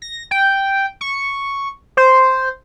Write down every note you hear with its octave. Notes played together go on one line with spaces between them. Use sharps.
A#6
G5
C#6
C5